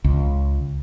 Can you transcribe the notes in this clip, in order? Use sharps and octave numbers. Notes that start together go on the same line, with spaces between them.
C#2